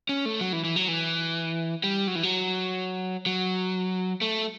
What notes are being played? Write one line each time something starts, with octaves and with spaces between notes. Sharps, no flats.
C#4
A3
F#3
E3
E3
F#3
E3
G3
F#3
E3
F#3
F#3
A3